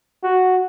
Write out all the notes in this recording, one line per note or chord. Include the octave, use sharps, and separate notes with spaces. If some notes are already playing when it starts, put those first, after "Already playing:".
F#4